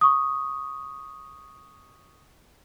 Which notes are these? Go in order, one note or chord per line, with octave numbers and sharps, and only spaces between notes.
C#6 D#6